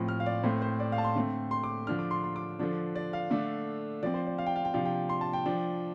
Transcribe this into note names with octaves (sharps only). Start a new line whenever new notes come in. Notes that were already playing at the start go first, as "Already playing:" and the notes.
Already playing: A2 F3 C4
F6
F5
D5
A2 A3 C4 C5
C5
D5
F5
A5
C6
D3 A3 C4
C6
D6
D3 F3 D4 F6
D6
C6
C6
D6
D3 F3 D4
D5
F5
D3 A3 D4
F3 C4 D5
C5
D5
F5
G5
F5
G5
C3 F3 D4 F5
G5
C6
A5
G5
F3 D4